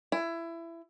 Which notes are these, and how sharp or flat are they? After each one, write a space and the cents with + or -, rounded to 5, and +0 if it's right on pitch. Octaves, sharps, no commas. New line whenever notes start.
E4 +20